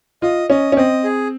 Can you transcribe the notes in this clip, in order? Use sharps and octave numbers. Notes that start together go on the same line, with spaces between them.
F4 D#5
C#4 D#5
C#4
C4 D#5
G#4